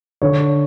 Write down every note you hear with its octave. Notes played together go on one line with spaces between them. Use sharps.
D3 C#5